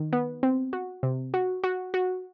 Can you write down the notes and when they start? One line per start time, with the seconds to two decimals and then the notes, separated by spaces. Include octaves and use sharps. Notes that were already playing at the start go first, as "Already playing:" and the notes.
Already playing: D#3
0.13 B3
0.43 C4
0.73 F#4
1.03 C3
1.34 F#4
1.64 F#4
1.94 F#4